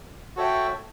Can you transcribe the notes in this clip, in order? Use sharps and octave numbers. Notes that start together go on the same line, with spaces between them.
F#4 A4 C#5 E5 G5